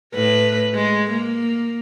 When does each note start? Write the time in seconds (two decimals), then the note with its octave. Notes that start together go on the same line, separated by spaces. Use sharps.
0.14 A2 B4
0.74 G#3
1.11 A#3